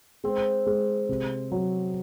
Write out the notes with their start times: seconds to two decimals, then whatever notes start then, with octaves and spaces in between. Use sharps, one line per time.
0.24 G#3 C4
0.66 G#3
1.09 C3
1.52 F#3